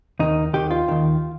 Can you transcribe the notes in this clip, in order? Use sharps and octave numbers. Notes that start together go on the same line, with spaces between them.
D#2 D#3 D#4
D#2 D#3 G4
F4
D#2 D#3